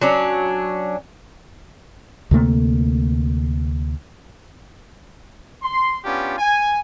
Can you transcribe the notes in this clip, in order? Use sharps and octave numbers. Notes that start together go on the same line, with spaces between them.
F#3 C#4 D4
D2 C3 A3 A#3
C6
B3 C#4 D4 F4 G4
G#5